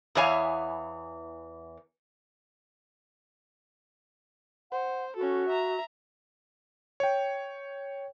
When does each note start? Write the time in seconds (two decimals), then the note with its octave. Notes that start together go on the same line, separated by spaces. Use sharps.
0.15 E2 E3 B3 C#5 F5 G#5
4.71 C5 F#5
5.16 C#4 F#4 A4
5.48 E5 A#5
7.00 C#5 G5